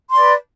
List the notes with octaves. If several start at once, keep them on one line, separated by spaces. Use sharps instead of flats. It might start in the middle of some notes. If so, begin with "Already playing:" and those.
B4 D5 C6